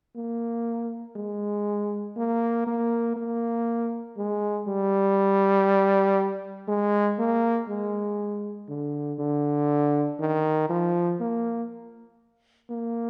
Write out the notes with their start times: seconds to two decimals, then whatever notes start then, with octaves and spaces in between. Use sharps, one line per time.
0.16 A#3
1.16 G#3
2.17 A#3
2.67 A#3
3.16 A#3
4.17 G#3
4.67 G3
6.68 G#3
7.19 A#3
7.69 G#3
8.69 D3
9.19 D3
10.20 D#3
10.70 F3
11.20 A#3
12.70 A#3